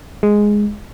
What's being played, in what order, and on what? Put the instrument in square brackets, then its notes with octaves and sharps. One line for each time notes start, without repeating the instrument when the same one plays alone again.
[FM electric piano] G#3